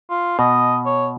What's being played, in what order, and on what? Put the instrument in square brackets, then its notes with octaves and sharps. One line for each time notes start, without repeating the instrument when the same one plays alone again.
[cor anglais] F4
[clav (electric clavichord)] B2 [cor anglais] D#5
[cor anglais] C#5